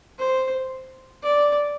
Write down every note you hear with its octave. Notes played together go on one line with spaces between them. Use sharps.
C5
D5